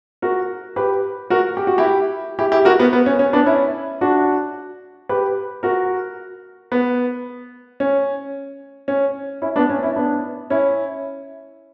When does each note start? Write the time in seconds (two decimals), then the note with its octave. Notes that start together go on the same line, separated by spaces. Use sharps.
0.22 F#4 A#4
0.76 G4 B4
1.30 F#4 A#4
1.57 G4
1.67 F#4
1.78 E4 G4
2.39 E4 G4
2.52 E4 G4
2.65 F#4 A#4
2.79 B3
2.93 B3
3.06 C#4
3.19 C#4
3.33 B3 D4
3.46 C#4 E4
4.01 D4 F#4
5.09 G4 B4
5.63 F#4 A#4
6.72 B3
7.80 C#4
8.88 C#4
9.42 C#4 E4
9.56 B3 D4
9.70 C#4
9.82 C#4 E4
9.96 B3 D4
10.50 C#4 E4